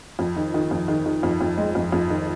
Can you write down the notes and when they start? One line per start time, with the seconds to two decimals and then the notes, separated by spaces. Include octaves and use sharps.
0.19 F2
0.36 D#3
0.54 D#3
0.71 F2
0.88 D#3
1.06 D#3
1.23 F2
1.41 F2
1.58 G#3
1.75 F2
1.92 F2
2.10 D#3